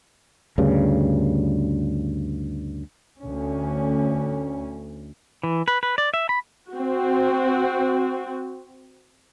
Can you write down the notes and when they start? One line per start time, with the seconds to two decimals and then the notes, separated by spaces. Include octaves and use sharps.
0.58 D2 G2 C#3
3.18 D2 C#4
5.43 E3
5.68 B4
5.83 B4
5.98 D5
6.14 E5
6.29 B5
6.72 C4 F#4